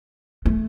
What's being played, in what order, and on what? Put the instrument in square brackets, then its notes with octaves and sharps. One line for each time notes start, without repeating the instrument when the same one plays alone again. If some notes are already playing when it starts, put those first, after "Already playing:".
[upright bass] A3